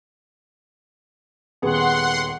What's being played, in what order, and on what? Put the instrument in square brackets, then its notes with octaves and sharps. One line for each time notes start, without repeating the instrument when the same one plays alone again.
[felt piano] D#1 B3 G#4 [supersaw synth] F#5 C6